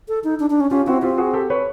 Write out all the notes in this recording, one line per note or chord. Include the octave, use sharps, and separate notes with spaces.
A4
D#4
D4
D4
C#4
C#4 F4 G4
C4 E4 F#4
C4 F4 G4
F#4 G#4
G4 A4
B4 C#5